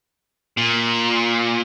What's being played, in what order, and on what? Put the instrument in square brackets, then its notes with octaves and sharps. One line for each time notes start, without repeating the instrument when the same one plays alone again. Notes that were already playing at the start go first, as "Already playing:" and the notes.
[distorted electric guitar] A#2